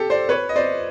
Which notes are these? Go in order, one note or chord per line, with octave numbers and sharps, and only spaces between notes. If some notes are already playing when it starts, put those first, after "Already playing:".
Already playing: G4 A4
C5 D5
B4 C#5
D#5
C5 D5